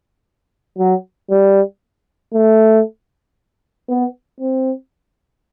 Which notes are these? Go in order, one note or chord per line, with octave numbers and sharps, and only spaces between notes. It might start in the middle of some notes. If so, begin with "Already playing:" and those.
F#3
G3
A3
B3
C4